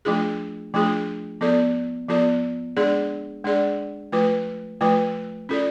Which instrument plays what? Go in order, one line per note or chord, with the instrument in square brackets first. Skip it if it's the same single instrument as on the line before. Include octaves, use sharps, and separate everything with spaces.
[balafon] F3 A3 D4 F4 G#4
F3 A3 D4 F4 G#4
F3 B3 F4 A4 D5
F3 B3 F4 A4 D5
G#3 D4 G#4 D5
G#3 D4 G#4 D5
F3 A3 F4 B4
F3 A3 F4 B4
C#4 F4 A4 D5